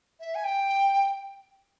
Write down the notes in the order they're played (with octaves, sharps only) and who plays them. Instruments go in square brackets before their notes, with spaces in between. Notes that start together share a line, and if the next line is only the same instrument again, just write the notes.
[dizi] E5
G#5
G5